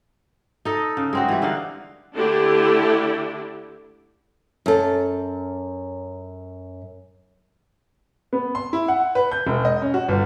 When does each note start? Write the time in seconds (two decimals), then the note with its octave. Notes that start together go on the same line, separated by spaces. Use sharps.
0.65 D#4 A4 D#5
0.97 C#3
1.13 G#3 C4 F#4
1.28 E3 G3
1.42 D3 D#4 F5 F#5
2.16 D3 A3 D4 E4 G4
4.66 F#2 A4
8.33 B3
8.55 C6
8.73 E4
8.88 F#5
9.15 B4
9.31 G6
9.47 E1
9.65 D#5
9.82 C#4
9.94 F#4
10.09 G1